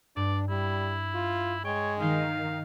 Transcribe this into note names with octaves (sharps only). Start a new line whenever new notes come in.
G2 D4 D5
G3 E4
F4
G#3 C#5 G5
D#3 D#4 F5 G6